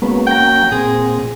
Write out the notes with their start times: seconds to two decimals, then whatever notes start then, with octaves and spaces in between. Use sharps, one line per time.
0.02 F#3 G#3 A#3 B3 C#4 B5
0.26 F#5 G5 G6 A#6
0.71 A#2 C4 G#4